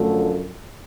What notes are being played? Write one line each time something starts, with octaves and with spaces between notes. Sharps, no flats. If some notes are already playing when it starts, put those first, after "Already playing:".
Already playing: F#2 D3 F3 A3